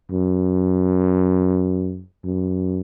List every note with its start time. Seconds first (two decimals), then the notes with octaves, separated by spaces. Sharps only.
0.12 F#2
2.24 F#2